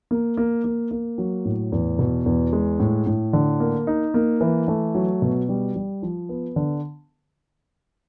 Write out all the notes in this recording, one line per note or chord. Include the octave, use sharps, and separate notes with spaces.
A#3
A#3
A#3
A#3
F#3
A2
E2
B2
E2
G#3
A2
A2
D3
A#3
D#4
A#3
E3
A3
F#3
B2
G3
G3
F3
B3
D3